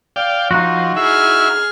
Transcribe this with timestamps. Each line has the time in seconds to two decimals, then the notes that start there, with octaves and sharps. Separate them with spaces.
0.16 D5 F5 G5
0.51 F3 D#4 F#4
0.96 E4 G#4 E5 F6